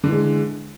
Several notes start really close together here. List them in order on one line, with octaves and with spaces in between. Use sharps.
D3 E3 G#3